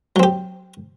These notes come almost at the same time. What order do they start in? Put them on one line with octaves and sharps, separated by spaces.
F#3 C4 G4